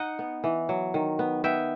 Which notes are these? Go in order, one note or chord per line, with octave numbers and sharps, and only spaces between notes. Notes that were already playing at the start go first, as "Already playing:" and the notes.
Already playing: D#4 D#5 F#5
B3
E3
F#3
D#3
B3
B3 E5 G5